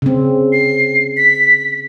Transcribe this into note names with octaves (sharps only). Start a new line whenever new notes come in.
C#3 C4
C7
B6